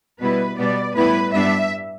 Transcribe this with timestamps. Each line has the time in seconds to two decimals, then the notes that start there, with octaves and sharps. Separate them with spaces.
0.20 B2 G3 E4 B4
0.57 B2 G3 B3 D5
0.95 A2 G3 B3 E4 B4
1.33 G2 G3 B3 D4 E5